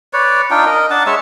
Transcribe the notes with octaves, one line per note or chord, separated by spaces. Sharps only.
B4 C#5 D5
D4 D#4 F4 G5
A#4 D#5
D4 F#5 A5
G#3 C#5 E5 E6